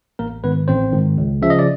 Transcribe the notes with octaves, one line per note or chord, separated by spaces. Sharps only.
A1 A#3 A#4
G#2 D#3 B3 B4
A1 C4 C5
G#2 D#3
C#2
C#3 F3 E5
D#5
D5